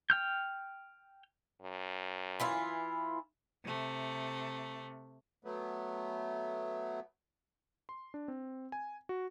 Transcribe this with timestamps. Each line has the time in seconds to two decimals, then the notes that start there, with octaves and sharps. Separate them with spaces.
0.10 G5 F6 G6
1.62 F#2
2.40 E3 E4 F4
3.64 C3 A3
5.45 F#3 A3 B3
7.89 C6
8.14 D4
8.28 C4
8.72 G#5
9.09 F#4